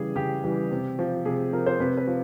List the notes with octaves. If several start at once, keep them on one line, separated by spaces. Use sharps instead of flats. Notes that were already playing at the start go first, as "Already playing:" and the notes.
Already playing: C#3 E3 G3 G#4
C#3 G4
E3 G3
C3
F3
C3 G#4
F3 A#4
C5
C3 B4
B4
F3